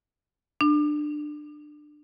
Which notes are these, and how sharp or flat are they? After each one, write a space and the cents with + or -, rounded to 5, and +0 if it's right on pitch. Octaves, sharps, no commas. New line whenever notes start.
D4 +20